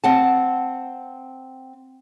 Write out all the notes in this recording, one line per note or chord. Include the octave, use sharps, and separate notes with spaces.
C4 F#5 A5